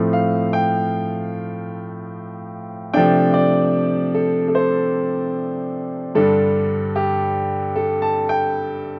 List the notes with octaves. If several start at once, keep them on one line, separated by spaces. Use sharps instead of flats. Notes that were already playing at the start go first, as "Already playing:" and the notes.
Already playing: A2 F3 A3 C4
F5
G5
C3 F3 A3 D4 G5
D5
A4
A4
C5
G2 D3 G3 D4 A4
G4
A4
A5
G5